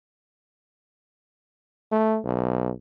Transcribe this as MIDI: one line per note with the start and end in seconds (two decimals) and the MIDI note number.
1.91 2.18 57
2.24 2.70 35